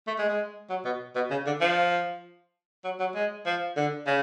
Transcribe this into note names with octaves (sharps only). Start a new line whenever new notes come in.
A3
G#3
G#3
F#3
B2
B2
C#3
D3
F3
F#3
F#3
G#3
F3
D3
C#3